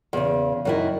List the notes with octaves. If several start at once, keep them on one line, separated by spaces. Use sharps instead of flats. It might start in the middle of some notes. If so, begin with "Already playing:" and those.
E2 C#3
F#2 D#3 E4